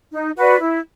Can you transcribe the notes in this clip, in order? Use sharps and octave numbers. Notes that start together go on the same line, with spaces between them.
D#4
F#4 B4 D5
E4